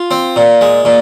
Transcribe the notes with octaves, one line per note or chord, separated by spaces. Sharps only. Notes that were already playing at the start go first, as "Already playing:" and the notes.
Already playing: F4
C4
A#2
G#3
A#2